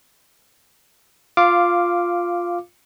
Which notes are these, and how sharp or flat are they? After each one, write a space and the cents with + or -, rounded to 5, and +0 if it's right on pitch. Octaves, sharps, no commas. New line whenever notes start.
F4 +5 F5 -10 D6 +0